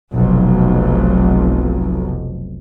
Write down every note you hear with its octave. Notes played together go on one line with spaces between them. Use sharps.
F1 B1